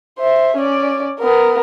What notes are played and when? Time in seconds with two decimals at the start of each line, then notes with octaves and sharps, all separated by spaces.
0.19 C5 E5
0.57 C#4 D5
1.19 B3 A#4